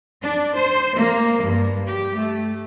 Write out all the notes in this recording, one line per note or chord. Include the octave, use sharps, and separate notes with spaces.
D4
C5
A#3
G2
G4
A3